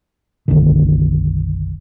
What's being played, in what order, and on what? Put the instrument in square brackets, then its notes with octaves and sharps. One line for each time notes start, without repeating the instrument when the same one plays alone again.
[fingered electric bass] F#1 B1 D3 D#3